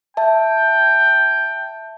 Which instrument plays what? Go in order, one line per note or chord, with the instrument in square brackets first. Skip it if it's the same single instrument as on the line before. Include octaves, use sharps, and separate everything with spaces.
[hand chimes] E5 A5 [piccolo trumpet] G5